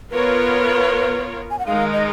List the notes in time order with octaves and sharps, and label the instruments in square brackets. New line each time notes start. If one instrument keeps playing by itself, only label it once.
[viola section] B3 F4 A#4 C#5 [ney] B4
[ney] G#5
F#5
[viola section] D#3 G#3 D#4 A#4 [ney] F5
[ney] D#5